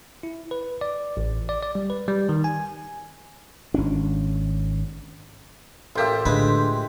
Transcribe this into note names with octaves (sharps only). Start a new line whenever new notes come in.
E4
B4
D5
A1
D5
D5
G3
B4
G3
D#3
G#5
G#1 C#4 D4
A1 A#3 F4 G4 E5
A2 D3 G#3 B4